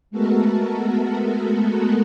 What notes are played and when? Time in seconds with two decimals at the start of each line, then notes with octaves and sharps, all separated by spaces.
0.11 G#3 A3 B3 F#4 A4 A#4